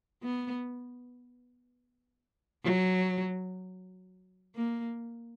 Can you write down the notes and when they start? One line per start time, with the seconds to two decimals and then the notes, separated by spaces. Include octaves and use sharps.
0.23 B3
2.64 F#3
4.55 A#3